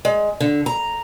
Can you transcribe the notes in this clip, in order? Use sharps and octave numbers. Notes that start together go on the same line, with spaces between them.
G#3
D3
A#5